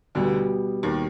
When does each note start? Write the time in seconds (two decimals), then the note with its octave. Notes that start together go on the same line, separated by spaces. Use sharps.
0.15 D2 B2 D3 G3 B3
0.83 D#2 D#3